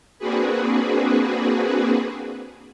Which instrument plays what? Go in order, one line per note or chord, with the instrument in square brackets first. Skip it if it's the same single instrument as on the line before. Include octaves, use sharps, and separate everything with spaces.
[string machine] A#3 C4 D4 F#4 G#4 B4